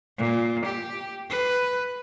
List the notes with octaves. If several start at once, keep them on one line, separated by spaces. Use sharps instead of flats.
A#2
G4
B4